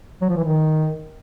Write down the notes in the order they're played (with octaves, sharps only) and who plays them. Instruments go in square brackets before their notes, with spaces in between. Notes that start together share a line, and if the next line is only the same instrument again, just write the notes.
[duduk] F#3
F3
E3
D#3